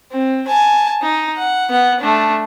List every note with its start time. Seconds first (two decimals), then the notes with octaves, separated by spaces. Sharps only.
0.11 C4
0.47 G#5 A5
1.02 D#4
1.37 F#5
1.69 B3 F#5
2.00 A3 D4